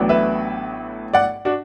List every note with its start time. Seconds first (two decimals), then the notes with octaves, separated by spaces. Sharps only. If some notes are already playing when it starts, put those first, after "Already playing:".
Already playing: A1 A2 F#3 B3 D4
0.09 B4 E5
1.13 D5 F#5
1.45 D4 F#4